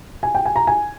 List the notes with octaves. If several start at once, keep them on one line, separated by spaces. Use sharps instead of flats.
G#5
G5
G#5
A#5
G#5